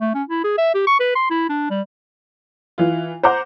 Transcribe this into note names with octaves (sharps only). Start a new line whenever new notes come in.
A3
C#4
E4
G#4
E5
G4
C#6
B4
C6
E4
D4
G3
E3 F4
C5 F#5 A#5 D6 G6